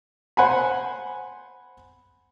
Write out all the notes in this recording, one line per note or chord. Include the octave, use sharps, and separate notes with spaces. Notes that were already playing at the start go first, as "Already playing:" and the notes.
C5 F#5 G#5 B5